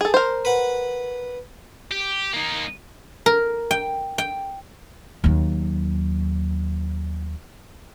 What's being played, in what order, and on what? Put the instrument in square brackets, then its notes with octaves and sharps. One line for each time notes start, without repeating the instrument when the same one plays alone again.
[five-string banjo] G#4 A4
A#4 C5
[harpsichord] B4 F#5
[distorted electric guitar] G4
A#3 D#4
[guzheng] A#4
G5
G5
[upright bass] D#2 F#3